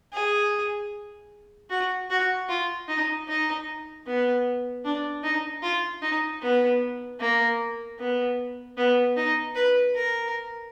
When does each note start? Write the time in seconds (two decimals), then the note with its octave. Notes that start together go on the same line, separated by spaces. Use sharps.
0.13 G#4
1.70 F#4
2.10 F#4
2.49 F4
2.88 D#4
3.28 D#4
4.07 B3
4.85 D4
5.24 D#4
5.63 F4
6.02 D#4
6.42 B3
7.20 A#3
7.99 B3
8.77 B3
9.17 D#4
9.55 B4
9.95 A#4